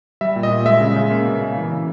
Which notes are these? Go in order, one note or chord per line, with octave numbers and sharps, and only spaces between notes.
G3 E5
A#2
D#5
A#2
G#3 E5
C#3
C#3
A#3
B2
A#3
E3
C#3